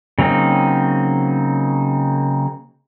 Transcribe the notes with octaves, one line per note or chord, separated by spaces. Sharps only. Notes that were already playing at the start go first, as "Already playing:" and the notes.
C#3 F#3 A#3 C4 D#4